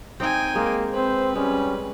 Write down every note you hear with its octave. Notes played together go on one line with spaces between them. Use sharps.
C4 D#4 G5 G#5
G#3 A#3
C4 B4 C5
G3 G#3 C#4